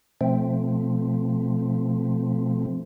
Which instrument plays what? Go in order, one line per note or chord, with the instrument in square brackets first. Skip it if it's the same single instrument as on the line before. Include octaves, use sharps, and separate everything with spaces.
[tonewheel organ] B2 F3 A3 C4